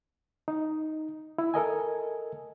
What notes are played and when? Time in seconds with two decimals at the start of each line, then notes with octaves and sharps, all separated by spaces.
0.48 D#4
1.38 E4
1.54 A4 A#4 D#5 G#5